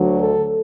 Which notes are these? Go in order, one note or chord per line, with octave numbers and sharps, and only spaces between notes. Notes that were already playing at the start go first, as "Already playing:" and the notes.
Already playing: D2 D3 F#3
A4